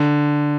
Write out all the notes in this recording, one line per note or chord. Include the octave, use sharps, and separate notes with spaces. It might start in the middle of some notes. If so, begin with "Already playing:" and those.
Already playing: D3